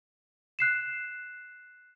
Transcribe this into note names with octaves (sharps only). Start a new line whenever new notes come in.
F#6 C7 E7